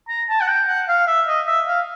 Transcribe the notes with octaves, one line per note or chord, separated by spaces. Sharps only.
A#5
A5
F#5
G5
F#5
F5
E5
D#5
E5
F5